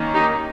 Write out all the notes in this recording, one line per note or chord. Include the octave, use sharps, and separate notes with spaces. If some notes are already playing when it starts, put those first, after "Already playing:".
Already playing: D#3 A#3 C#4
D#4 G4